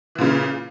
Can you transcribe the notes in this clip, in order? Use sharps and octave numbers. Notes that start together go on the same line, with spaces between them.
A#2 C#3 E3